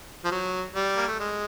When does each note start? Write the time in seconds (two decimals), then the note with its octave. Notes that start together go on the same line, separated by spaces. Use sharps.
0.25 F3
0.32 F#3
0.75 G3
0.97 A#3
1.07 A3
1.20 G#3